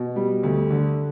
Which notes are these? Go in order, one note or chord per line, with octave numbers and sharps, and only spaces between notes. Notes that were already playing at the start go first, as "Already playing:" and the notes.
Already playing: B2
G3
D2
D3